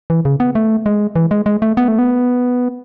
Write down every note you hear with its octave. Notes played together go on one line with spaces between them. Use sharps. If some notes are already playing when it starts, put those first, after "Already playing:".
E3
C#3
B3
A3
G#3
E3
G#3
G#3
A3
B3
A3
B3